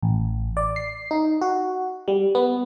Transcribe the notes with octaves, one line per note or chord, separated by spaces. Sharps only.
A1
D5
C7
D#4
F#4
G3
B3